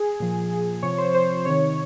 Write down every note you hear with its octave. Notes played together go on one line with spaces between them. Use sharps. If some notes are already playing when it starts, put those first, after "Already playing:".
Already playing: G#4
A#2 F3
C3 F3 C#5
C5
C5
C3 D#3 C#5